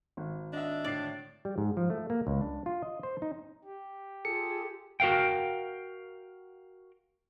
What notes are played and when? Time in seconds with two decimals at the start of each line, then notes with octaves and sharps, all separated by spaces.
0.17 G#1
0.53 D4 D#5 E5
0.84 A2 D3 D5 C7
1.45 G3
1.58 G#2
1.77 F3
1.90 A3
2.10 A#3
2.27 C#2
2.41 D4
2.66 F4
2.82 D#5
3.03 C5
3.22 D#4
3.65 G4
4.25 F4 G#4 A4 C#7
5.00 F#4 A#4 F5 G5